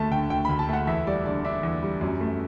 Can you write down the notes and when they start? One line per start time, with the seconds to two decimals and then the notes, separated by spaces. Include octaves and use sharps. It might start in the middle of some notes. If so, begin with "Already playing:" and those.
Already playing: D2 A3 A5
0.11 D3 G5
0.30 D2 G5
0.45 D2 B5
0.59 A5
0.69 A3 F#5
0.87 E2 E5
1.07 G3 D5
1.26 D3 D5
1.44 D4 E5
1.63 E2
1.83 G3
2.01 F#2
2.20 A3